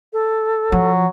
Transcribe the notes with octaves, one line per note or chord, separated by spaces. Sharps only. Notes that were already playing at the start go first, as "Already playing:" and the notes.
A4
F3 F#3